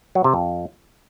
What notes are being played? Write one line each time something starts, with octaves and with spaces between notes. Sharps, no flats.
F#3
C3
F2